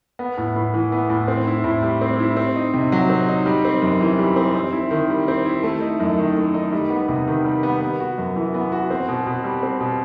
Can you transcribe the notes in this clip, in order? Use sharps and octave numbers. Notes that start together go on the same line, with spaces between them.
B3
A2
A2
E3
B3
A2
C4
E4
A2
G3
C4
E4
C4
D#4
C3
F#3
C4
D#4
G3
C4
F#2
E3
G3
C4
C4
E4
D#3
G3
C4
E4
A3
D#4
F#2
D#3
A3
D#4
G3
B3
C3
D#3
G3
B3
B3
F#4
F#2
E3
B3
F#4
C4
B2
B2
G3
C4
B2